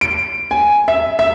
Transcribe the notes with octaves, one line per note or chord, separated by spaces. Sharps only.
D7
G#5
E5
E5